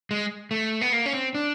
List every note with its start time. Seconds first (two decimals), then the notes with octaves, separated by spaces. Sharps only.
0.11 G#3
0.51 A3
0.81 B3
0.92 A#3
1.06 C#4
1.13 C4
1.35 D4